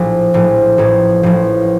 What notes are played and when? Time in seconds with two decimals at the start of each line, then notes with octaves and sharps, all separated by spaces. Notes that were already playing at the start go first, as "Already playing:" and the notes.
Already playing: A#1 A2 F3
0.34 A#1 A2 F3
0.78 A1 A2 F3
1.23 A1 A2 F3